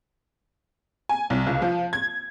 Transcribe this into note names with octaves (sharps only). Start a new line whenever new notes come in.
G#5
C2
C#2
F3
G#6